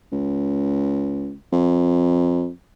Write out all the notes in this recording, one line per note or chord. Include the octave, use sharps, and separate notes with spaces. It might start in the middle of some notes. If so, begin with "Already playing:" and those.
C#2
F2